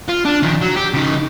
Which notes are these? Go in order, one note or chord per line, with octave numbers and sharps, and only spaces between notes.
F4
D4
D#3 F3
F#3
G4
C#3 D#4